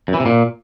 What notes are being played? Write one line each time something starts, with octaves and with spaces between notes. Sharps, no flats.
F#2
E3
C3
A#2